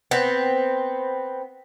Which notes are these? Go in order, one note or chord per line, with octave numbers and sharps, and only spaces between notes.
B3 C4